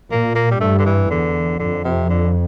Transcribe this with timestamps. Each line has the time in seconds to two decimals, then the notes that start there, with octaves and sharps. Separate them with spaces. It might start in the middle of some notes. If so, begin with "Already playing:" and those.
0.11 A#2 A#3
0.35 A#3
0.51 G3
0.60 G2 A3
0.78 D3
0.85 E3
1.10 E2 D3
1.59 F2 D3
1.84 C3
2.09 D3